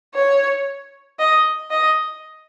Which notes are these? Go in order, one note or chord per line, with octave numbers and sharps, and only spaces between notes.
C#5
D#5
D#5